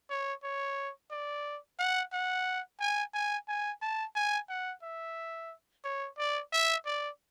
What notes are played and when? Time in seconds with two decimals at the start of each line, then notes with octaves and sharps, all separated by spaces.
0.10 C#5
0.43 C#5
1.11 D5
1.79 F#5
2.13 F#5
2.80 G#5
3.14 G#5
3.48 G#5
3.82 A5
4.15 G#5
4.49 F#5
4.83 E5
5.84 C#5
6.18 D5
6.52 E5
6.86 D5